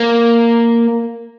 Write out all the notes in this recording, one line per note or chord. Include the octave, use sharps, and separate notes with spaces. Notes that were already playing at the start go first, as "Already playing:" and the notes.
Already playing: A#3